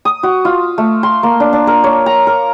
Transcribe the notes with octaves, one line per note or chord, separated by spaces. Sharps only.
D#6
F#4
F4
A3
C6
A#3
D4
D4
A#4
C#5
A#5
A#4